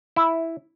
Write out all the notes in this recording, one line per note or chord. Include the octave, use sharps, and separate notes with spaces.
E4